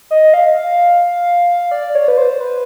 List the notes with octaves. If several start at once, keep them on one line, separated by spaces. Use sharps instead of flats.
D#5
F5
D5
C#5
B4
C5
B4